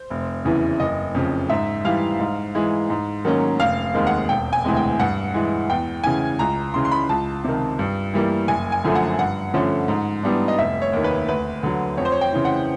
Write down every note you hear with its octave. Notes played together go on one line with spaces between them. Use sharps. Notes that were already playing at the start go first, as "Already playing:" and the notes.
Already playing: C5
F1
E2 C#3 E3
F#1 D#5
F2 C#3
G#2 E5
E3 G3 F5
G#2
E3 G#3
G#2
D#3 F#3 A#3 C#4
F1 F5
D#2 D#3 G#3 C4
F#5
E1 G5
G#5
D2 C3 E3 G#3
G5
G2 F#5
E3 G#3
E2 G5
C#3 E3 G#5
C#2 A#5
C#3 E3 C6
C6
B5
C#2 A5
C3 D#3
G2
E3 G3 A#3
F#1 G#5
G#5
F#2 D3 F3 A3
F#5
G2 F#5
D3 F3 A3 C#4
G#2
E3 G3 B3 D4
D#5
F1 E5
C#5
D#2 D#3
B4
D2 B4
D3 F#3
F2 C#5
C5
C#5
G5
C#3 E3
F#5